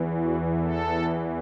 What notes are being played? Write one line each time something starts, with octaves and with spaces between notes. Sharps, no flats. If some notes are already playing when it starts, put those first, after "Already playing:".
Already playing: E2 E3
F#4
A4